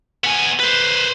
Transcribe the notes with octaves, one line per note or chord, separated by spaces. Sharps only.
B3 G#5
B4 C5